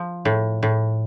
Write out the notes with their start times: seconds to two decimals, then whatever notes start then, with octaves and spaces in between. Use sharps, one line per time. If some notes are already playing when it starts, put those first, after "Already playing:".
Already playing: F3
0.25 A2
0.63 A2